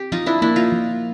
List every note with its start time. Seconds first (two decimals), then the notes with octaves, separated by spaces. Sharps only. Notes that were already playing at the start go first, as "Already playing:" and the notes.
Already playing: C4 G4
0.12 F3 D#4 F4
0.26 D4 E4
0.42 A#3 D4 E4
0.56 D#4 F4
0.72 F3